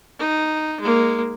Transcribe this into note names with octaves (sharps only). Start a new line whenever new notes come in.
D#4
G#3 A#3